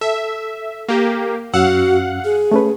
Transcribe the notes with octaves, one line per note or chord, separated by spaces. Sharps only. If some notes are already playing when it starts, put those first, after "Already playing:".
A4 E5
A#3 G4
F#2 C#4 F#4 F5 F#5 E6
G#4
A3 C#4 B4